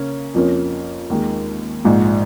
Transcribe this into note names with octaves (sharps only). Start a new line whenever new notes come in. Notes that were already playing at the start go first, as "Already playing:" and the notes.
Already playing: C#3 A#3 C#4
F2 F3 A#3 C#4
D#2 D#3 G#3
A#1 G#2 F3 G#3